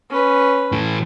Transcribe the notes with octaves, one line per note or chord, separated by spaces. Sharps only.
C#4 B4
A2 E3